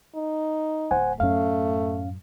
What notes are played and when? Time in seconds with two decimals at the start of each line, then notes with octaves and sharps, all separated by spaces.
0.15 D#4
0.91 D1 C5 F#5 G#5
1.20 F#2 A2 A3 C#4 F5